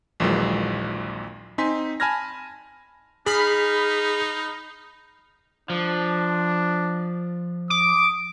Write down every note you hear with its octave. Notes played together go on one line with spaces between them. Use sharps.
A#1 D#2 A#2 E3 F#3 G#3
C4 D#4 G#5 C6 B6
G#5 A5 B5 F6 G#6 A#6
D#4 G#4 B5 F6 C7
F3 D4
D6 D#6